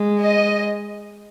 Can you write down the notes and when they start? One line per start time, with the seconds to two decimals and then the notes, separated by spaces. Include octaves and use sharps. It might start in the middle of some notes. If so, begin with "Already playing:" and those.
Already playing: G#3
0.22 D#5